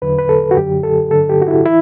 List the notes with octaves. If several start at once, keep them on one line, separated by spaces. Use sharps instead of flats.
E2 D3 F#3 B4
B4
A4
F#4
F#2 D3 F#3 G4
A4
G2 D3 F#3 A4
G4
F#4
E4
E3 E4